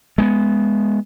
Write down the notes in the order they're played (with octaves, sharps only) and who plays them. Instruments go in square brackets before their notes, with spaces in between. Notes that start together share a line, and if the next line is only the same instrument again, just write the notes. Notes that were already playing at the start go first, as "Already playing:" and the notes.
[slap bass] G#3 A#3 B3